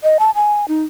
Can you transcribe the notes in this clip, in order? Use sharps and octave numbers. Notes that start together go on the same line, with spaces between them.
D#5
A5
G#5
D#4